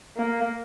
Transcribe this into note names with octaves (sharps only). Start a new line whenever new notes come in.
A#3